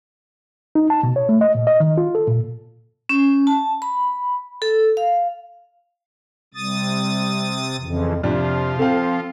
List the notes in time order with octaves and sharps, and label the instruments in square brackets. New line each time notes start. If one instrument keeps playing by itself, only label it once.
[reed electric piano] D#4
A5
B2
C#5
A3
D#5
A#2
D#5
D#3
F4
A4
A#2
[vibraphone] C#4
A5
B5
A4
F5
[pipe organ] C3 D#6 A6 [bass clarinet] G3
[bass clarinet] F2 [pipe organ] C#3 E3 F3
[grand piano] F2 D4 [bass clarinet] C3 [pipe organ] F3 F4
[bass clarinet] C4 [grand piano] A4 F5